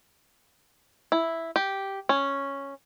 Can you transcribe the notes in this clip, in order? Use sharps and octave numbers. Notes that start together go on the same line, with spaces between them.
E4
G4
C#4